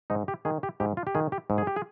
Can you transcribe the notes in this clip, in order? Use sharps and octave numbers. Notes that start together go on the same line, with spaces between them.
G#2 D#4
G4
D#3 G#4
G4
G#2 G4
F4
G4
D#3 G#4
G4
G#2
G#4
G4
G#4